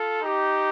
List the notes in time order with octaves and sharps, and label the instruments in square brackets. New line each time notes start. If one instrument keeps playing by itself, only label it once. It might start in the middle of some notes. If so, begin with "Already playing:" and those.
Already playing: [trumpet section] F4 A4
D#4 G4